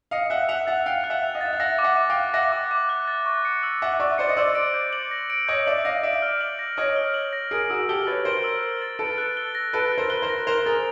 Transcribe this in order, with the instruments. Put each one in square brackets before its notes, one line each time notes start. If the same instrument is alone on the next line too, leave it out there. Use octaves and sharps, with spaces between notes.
[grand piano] D#5 F5 [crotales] C#7
[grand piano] E5 F#5 [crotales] F#6
[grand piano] E5 F#5 [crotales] F7
[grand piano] E5 F#5 [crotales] A6
[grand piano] F5 G5 [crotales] C#7
[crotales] F#6
[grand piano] E5 F#5
[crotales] F7
[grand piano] D#5 F5
[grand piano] E5 [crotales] A6
[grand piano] F5
[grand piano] E5 F#5 [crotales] A#6
[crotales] D6
[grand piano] E5 F#5
[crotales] D6
[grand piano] F5 G5
[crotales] F#6
[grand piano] E5 F#5 [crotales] A#6
[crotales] D6
D6
F#6
A6
C#6
C#7
E6
[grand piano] E5 F#5 [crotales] A6
[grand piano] D5 E5 [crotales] C#6
[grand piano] C5 D5 [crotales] C#7
[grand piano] D#5
[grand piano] C5 D5 [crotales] E6
[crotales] D7
G6
F#7
A#6
D7
[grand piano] C#5 D#5 [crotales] G6
[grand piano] D5 E5 [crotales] F#7
[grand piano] D#5 F5 [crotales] A#6
[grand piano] D5 E5 [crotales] D7
[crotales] F6
F#7
A#6
[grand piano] C#5 D#5 [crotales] D7
[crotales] F6
F#7
A#6
[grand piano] G#4 A#4 [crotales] D7
[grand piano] F#4 G#4 [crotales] E6
[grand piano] G4 A4 [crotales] G7
[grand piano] B4 C#5 [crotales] A6
[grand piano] A#4 C5 [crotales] D7
[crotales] E6
G7
A6
[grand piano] A4 B4 [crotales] D7
[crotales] F#6
G7
A#6
[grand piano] A4 B4 [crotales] D7
[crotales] F#6
[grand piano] A#4 C5
[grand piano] B4 [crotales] G7
[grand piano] A#4 C5
[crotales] A#6
[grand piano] A#4 C5 [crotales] F7
[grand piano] G#4 A#4 [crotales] A6